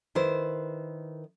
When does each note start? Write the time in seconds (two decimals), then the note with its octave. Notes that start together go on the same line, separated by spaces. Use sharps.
0.15 D#3 E4 B4 C5